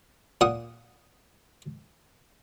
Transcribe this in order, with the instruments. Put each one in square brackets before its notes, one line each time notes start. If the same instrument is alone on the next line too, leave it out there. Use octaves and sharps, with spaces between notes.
[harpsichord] A#2 F#5 D#6